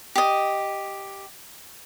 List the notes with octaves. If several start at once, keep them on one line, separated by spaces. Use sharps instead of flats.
G4 D#5